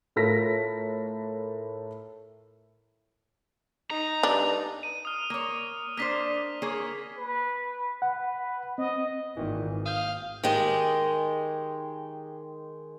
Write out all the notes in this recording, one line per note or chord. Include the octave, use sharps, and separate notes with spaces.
A2 F4 A4 A#4 A#6 B6
D#4 A#5
G2 D4
D#7
D#6 F6
A#3 C#5
A#3 D4 C5 F6 B6
A#3 G#4 C#5
B4
B4 F#5
C4 D#5
G#1 A#2 D#3 E3
F5 D#6 G6
D#3 G#3 G4 D#5